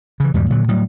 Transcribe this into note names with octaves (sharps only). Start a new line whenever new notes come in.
C#3 E3
E2 G#2 B2 G3
A#2 D3 F#3
A2 F#3 G3